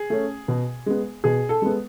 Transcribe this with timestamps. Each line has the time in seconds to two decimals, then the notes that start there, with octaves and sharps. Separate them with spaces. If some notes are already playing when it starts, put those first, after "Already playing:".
Already playing: G#4
0.10 A3 C#4
0.48 B2
0.86 G#3 B3
1.24 B2 G#4
1.49 A4
1.62 G#3 B3